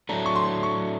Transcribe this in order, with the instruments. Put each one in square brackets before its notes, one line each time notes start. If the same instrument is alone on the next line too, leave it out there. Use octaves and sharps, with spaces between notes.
[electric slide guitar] A2 F#3 A3 D4 [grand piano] A#5
[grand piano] C#6
C6
C#6